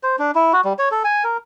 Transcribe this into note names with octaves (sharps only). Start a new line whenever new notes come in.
C5
D4
E4
F#4
G3
C#5
A4
G#5
A#4